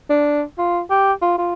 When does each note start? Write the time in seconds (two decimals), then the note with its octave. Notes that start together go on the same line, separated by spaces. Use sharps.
0.10 D4
0.58 F4
0.90 G4
1.22 F4
1.38 F4